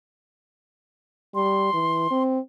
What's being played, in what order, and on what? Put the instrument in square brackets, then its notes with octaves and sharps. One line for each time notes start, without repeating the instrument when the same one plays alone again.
[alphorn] G3 [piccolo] C6
[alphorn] E3
C4